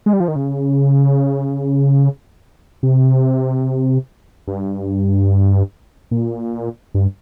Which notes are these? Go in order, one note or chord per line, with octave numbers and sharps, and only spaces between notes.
G#3
G3
F3
D#3
C#3
C3
G2
A#2
G2